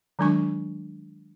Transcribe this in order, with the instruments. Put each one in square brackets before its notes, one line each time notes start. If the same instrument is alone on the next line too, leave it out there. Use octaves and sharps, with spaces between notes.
[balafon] D#3 F#3 G#3 D4 G#5 C#6